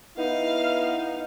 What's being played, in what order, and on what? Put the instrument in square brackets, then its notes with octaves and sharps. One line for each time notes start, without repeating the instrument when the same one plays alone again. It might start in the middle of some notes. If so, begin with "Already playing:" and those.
[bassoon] B3 [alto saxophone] D#4 [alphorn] E4 [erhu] F5